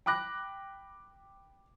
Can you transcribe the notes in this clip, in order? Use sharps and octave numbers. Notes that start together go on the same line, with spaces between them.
G5 B5 D6 F#6 A#6